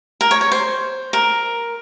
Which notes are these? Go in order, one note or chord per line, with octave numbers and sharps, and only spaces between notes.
A#4
C#5
C#5
C5
A#4